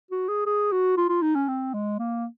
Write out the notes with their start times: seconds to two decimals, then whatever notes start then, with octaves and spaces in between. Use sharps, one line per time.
0.11 F#4
0.28 G#4
0.46 G#4
0.72 F#4
0.97 F4
1.09 F4
1.22 D#4
1.35 C#4
1.48 C4
1.74 G#3
1.99 A#3